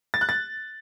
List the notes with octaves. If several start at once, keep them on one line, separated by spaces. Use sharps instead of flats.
A6
F#6
A6